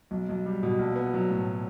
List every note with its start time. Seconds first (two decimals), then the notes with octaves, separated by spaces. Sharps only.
0.11 B1
0.29 B1
0.46 G3
0.63 B2
0.79 A#1
0.96 B3
1.14 F#3
1.30 A2